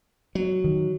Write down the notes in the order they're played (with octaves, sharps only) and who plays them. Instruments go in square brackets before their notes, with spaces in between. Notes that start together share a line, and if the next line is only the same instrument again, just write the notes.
[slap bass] F#3
[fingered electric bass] D#3